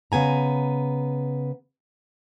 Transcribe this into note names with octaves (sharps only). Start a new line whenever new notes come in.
C#3 B3 G#5 A#5